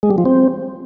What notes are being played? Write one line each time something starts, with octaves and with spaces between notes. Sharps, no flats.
G#3
G3
F3
C4